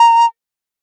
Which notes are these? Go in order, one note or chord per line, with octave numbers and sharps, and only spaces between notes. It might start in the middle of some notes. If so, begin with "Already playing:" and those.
Already playing: A#5